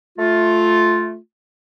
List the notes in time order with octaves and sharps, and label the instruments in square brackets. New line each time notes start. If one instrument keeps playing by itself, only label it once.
[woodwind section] A3 F4